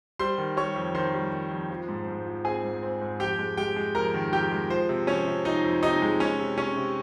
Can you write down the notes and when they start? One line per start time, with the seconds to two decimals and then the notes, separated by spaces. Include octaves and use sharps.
0.19 G3 C5 C6
0.38 D#3
0.57 G3 C#5 C#6
0.76 F2
0.94 D#3 C5 C6
1.14 G3
1.32 D#3
1.51 F2
1.70 F3
1.88 G#2
2.08 G#2
2.26 F3
2.45 C4 G#4 G#5
2.64 G#2
2.82 C4
3.01 G#2
3.20 F2 G4 G5
3.39 G#3
3.57 G#3 G4 G5
3.76 G#3
3.95 F2 A#4 A#5
4.14 D#3
4.33 F2 G4 G5
4.51 G#3
4.70 F3 C5
4.89 C3
5.07 F3 C#4 C#5
5.27 C3
5.45 F3 D#4 D#5
5.64 F2
5.82 C3 D#4 D#5
6.02 G#3
6.20 C3 C#4 C#5
6.40 C3
6.58 C3 C#4 C#5
6.77 C3